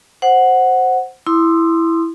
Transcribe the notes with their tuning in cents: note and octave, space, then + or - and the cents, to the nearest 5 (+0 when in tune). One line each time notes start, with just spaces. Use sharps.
C5 +0 F#5 +0
E4 +0 C6 +0 D#6 -25